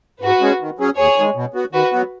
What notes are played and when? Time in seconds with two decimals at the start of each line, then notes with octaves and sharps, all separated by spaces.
0.21 G#2 F#4 B4
0.40 G#3 C#4 G#4
0.60 D#3
0.79 F#3 C#4 G#4
0.97 D#2 G#4 C#5
1.16 D#3 G#3
1.35 B2
1.54 B3 F#4
1.73 D#3 F#4 B4
1.92 F#3 B3 F#4